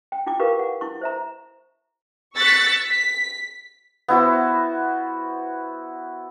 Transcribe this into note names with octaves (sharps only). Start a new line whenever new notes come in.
G5
E4 F4 G5 D6
F4 G4 A#4 B4 F5
F#5
E4 C#6
C5 E5 A#5
C#6 E6 F#6 A6 B6 C#7
B6
B3 E4 F#4 C5